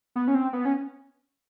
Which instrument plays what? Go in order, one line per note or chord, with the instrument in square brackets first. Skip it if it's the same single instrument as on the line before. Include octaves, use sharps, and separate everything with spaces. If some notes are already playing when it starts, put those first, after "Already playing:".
[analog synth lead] B3
C#4
C4
B3
C#4